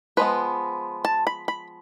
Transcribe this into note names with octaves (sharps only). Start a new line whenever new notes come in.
F3 G#3 B3 B4
A5
B5
B5